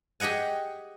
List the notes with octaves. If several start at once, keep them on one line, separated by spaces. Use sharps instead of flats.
G4 G#4 D#5 F#5 G#5